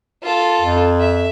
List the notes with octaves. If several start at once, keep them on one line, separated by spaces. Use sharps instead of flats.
F4 A4
F2
E5